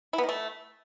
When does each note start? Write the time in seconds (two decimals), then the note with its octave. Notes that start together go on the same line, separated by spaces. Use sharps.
0.13 E4
0.18 B3
0.23 D#3
0.29 A3